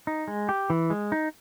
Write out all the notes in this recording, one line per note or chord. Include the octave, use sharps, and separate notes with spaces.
D#4
G#3
G4
E3
G#3
D#4